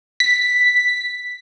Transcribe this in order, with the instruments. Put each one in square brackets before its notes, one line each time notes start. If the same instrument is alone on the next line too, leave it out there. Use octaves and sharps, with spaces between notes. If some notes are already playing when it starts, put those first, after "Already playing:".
[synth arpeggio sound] B6